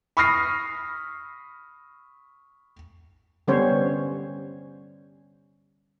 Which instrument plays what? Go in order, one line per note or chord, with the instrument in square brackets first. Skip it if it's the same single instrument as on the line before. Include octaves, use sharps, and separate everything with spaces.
[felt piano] B5 C#6 D#6 F6 A#6 C7
[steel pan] D3 G3 B3 C#4 C5 C#5